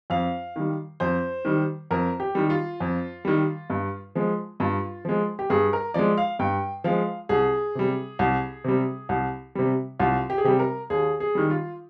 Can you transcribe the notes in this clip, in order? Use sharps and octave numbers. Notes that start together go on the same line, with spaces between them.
F2 F5
D#3 G3
F2 C5
D#3 G3
F2 A#4
G4
D#3 G3
F4
F2
D#3 G3
G2
F3 G#3
G2 F4
F3 G#3
G4
G2 G#4
A#4
F3 G#3 D5
F5
G2 G5
F3 G#3 F5
C2 G#4
C3 G3
C2
C3 G3
C2
C3 G3
C2 F4
G4
G#4
C3 G3 G4
A#4
D#2 G#4
G#4
D#3 G3
F4